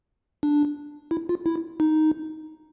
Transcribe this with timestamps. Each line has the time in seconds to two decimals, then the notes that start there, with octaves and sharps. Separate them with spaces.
0.43 D4
1.11 E4
1.29 F4
1.46 E4
1.80 D#4